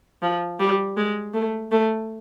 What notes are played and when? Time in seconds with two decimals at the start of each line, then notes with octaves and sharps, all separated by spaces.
0.22 F3
0.59 G3
0.97 G#3
1.34 A3
1.72 A3